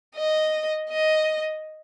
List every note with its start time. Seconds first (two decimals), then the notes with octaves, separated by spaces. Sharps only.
0.16 D#5
0.89 D#5